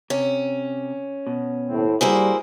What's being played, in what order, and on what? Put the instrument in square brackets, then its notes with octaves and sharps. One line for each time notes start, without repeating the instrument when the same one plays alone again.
[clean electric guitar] C3 [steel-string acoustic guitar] C#4
[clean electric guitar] B2
[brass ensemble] D#2 A2 C4
[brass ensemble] G3 F#4 [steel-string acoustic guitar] A#3 E4 C5 [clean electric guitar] G#4